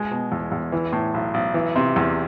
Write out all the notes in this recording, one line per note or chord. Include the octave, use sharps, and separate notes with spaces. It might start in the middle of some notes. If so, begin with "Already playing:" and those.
Already playing: B2 G#3
B2
E2
E2
E3
A2
B1
B1
E3
C3
E2